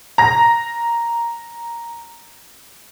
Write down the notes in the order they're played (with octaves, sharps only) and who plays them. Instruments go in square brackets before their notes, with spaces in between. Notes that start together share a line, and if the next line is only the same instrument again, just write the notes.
[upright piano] A#5 A#6